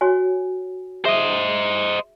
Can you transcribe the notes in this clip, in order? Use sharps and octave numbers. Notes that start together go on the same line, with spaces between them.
F#4 C#5 G#5
G#4 C5 D#5 E5